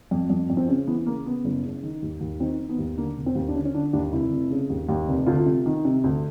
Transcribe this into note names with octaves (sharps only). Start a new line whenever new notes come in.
F2
F2
F2
C4
C#3 C#4
E3 B3
C#3 A#3
C#3 B3
F#1
C#3
D#3
D#2
D#2
D#3 C4
D#3
B3
D#2
D3 A#3
E1
C4
D#2
D4
D3 C#4
C#4
D3 D4
D#2 D4
F1 E4
F1
C#3
D#2
D#2
F1
D2 F4
C3
D#3
C3
D2